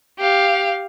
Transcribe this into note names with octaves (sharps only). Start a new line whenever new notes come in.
G4 F5